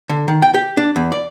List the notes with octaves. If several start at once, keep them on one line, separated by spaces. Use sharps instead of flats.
D3
D#3
G5
G4
D4
E2
D5